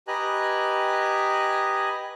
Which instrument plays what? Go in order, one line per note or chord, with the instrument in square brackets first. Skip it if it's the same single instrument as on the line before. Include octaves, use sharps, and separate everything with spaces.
[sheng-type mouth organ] G4 B4 D#5 G#5 A#5 F#6